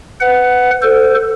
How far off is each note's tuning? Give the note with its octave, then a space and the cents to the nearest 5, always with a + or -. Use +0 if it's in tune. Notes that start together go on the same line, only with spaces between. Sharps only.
B4 +20 F#5 +0
A4 +15 C5 -15